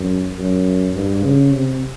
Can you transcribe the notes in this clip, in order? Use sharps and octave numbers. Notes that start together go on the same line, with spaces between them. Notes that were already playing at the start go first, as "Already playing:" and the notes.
Already playing: F#2
F#2
G2
C#3
C3